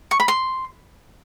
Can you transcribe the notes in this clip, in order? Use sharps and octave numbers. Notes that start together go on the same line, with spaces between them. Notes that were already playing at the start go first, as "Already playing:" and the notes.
C#6
B5
C6